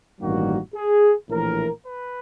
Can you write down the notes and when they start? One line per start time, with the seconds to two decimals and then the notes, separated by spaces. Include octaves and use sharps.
0.19 A1 G2 D#3 G3 A#3 F#4
0.74 G#4
1.30 A#1 A2 E3 A#4
1.86 B4